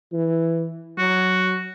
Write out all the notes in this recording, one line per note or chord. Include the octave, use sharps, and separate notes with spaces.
E3
F#3 F#4